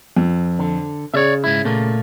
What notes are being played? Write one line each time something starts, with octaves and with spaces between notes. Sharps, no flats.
F2
D3
C#3 C#5 D5 E5
G#2 E4
A#2 A3 A#3